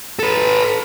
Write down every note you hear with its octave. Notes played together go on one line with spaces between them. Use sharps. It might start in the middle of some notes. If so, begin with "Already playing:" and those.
A4 B4